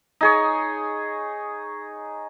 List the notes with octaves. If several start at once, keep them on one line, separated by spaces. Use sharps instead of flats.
D#4 G#4 C#5